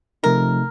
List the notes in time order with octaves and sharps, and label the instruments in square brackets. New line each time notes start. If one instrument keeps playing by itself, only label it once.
[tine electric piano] C3 F3 A3 D#4 [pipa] A#4